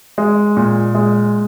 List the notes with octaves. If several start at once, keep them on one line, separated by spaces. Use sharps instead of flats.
G#3
A#2
G#3